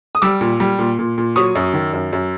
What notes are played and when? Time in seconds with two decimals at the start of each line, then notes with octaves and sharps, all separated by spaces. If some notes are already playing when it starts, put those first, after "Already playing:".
0.15 D#6
0.22 G3 D6 E6
0.41 A#2
0.60 G3
0.79 A#2
0.99 A#2
1.18 A#2
1.36 F#3 C#6 D#6
1.55 F#2
1.73 D#3
1.93 F#2
2.13 F#2